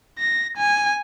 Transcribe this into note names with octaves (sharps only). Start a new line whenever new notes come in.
A#6
G#5